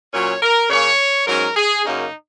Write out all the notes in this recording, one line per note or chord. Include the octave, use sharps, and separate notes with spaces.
A#2 F#3 C#4 C#5
A#4
C#3 A#3 C#4 C#5
G#2 F#3 C#4 A#4
G#4
F#2 C#3 A#3 C#4 D#4